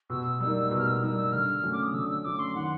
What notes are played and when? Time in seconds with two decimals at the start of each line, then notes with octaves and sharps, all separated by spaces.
0.10 B2 E6
0.40 G3 A#3 D#4
0.71 B2
0.78 F6
0.87 E6
1.02 G3 A#3 D#4 E6
1.17 E6
1.32 D3 F6
1.63 F#3 A3 C#4
1.73 D6
1.83 D#6
1.94 D3 E6
2.09 E6
2.24 F#3 A3 C#4 D6
2.39 C6
2.55 D#3 F#5